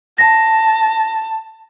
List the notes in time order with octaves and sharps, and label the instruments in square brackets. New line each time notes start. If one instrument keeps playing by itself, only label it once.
[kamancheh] A5 [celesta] A#6